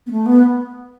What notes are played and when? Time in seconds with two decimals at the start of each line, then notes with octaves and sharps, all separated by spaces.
0.06 B3
0.11 A3
0.26 B3